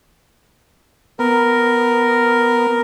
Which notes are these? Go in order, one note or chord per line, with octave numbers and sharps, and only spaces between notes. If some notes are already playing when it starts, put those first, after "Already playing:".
B3 A#4